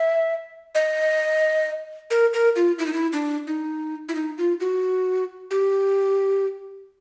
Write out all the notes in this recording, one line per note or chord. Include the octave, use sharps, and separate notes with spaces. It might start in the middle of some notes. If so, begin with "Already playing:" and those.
Already playing: E5
D#5
A#4
A#4
F4
E4
D#4
E4
D4
D#4
E4
D#4
F4
F#4
G4